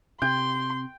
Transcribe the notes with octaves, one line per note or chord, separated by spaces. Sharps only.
C3 G5 C6